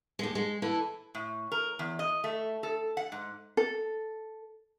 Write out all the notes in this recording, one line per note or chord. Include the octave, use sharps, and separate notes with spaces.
D#2 G#3
G#3
E3 E4 A4
A2
A#4
E2
D#5
A3
A4
F#5
G#2
A4